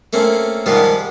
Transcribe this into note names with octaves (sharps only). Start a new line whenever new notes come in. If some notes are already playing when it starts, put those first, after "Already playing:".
A3 A#3 C4 C#4
G#2 D#3 F3 G3 G#3 F4